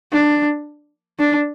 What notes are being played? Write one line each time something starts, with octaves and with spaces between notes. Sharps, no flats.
D4
D4